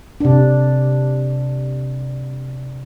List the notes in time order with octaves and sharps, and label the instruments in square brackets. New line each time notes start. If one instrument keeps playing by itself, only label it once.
[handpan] C3 D4